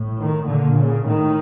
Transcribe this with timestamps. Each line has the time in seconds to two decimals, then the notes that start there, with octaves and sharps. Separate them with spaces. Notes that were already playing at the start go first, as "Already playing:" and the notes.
Already playing: A2
0.18 D#3
0.47 A#2 D3
0.77 C#3
1.05 A2 D#3